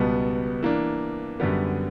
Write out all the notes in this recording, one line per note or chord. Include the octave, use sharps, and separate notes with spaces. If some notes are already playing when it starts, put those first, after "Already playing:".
Already playing: C#2 B2 G3 B3
E3 A#3 D4
F#2 D3 G3 B3